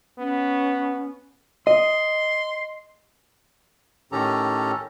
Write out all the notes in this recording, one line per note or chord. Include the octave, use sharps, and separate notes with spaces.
B3 C#4
D#5 C6
A2 D#3 C#4 G4 A4 A#5